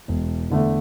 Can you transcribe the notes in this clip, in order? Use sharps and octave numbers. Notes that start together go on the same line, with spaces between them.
E1
E2 D3 A3